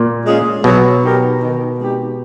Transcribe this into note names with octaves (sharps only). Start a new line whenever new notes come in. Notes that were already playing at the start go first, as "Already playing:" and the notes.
Already playing: A#2
G#3 C#4 F4 G#4
B2 F#3
B3 D#4 G4 A#4
D#3
G#3 C4 D#4 G4